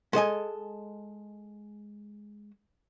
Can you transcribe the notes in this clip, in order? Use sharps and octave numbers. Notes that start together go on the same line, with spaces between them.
G#3 A4 D#5 G#5